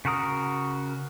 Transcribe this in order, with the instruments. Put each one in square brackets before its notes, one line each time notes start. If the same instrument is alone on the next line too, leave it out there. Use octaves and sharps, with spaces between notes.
[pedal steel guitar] C#3 F#4 A#4 D#6